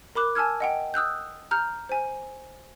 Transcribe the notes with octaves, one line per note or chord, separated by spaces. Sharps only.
A#4 B5 D6 F#6
G#5 A5 E6 F6 G#6
D#5 F#5 G5
D#6 E6 F#6 G6
A#5 F6 G6
C5 G#5